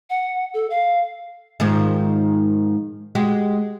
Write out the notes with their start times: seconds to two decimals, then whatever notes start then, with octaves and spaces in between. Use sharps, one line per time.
0.10 F#5
0.54 A4
0.70 F5
1.60 G#2 D#3 F3
3.15 G#3 F#4 G4